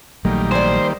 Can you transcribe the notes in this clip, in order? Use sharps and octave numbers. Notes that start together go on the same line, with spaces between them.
A#1 D#3 F#3 G3 A3 A#3
C5 D5 G#5